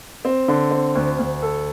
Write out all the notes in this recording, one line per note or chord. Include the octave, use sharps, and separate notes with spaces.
C4
D3
C4
D2
D2
A4